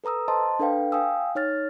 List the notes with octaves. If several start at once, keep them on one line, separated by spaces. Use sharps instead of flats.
A4 B4 A#5 D#6 E6
C5 D#5 A5 C6
D4 A4 B4 F5 G5
F5 G5 G#5 D#6 E6
D#4 C#5 F6 A6